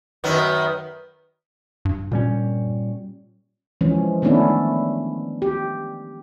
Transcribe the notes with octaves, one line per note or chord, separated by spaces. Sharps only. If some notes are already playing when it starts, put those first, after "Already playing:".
F#2 D#3 B3
G2
A#2 G3 C#4
E3 F3 G#3 C#4
D#3 A3 B3 C#4 D4 E4
G4